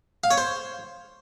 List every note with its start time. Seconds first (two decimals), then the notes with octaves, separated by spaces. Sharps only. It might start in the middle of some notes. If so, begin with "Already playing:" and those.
0.24 F5
0.31 C#5
0.38 C5